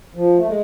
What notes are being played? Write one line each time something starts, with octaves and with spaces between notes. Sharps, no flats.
F3
A3
G#3